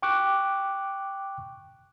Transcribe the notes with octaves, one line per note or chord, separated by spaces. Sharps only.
G5 C#6 D6 F#6